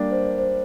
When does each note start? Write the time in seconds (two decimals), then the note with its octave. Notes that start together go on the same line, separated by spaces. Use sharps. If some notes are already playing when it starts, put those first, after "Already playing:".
Already playing: G3 A#3 D4 A#4
0.11 C5
0.24 D5
0.38 C5